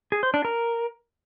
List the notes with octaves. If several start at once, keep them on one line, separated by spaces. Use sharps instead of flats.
G#4
C5
D4
A#4